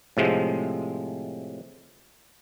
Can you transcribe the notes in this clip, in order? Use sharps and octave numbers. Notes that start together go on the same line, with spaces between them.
A2 C3 F3 G#3